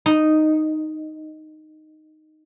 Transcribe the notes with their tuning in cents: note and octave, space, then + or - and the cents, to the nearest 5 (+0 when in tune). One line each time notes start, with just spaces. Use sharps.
D#4 -5